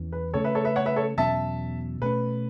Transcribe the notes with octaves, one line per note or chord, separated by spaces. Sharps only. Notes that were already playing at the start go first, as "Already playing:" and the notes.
Already playing: E2 E3 C#4
B4
C#3 A3 C#4 A4 C#5
B4 E5
A4 C#5
B4 E5
C#5 F#5
B4 E5
A4 C#5
E2 B2 F#3 C#4 E5 A5
B2 A3 C#4 B4